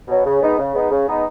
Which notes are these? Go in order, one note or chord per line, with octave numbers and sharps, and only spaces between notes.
B2 F#3
C#3
G#3 B3 D#4
C#3
G#3 B3 D#4
C#3
G#3 B3 D#4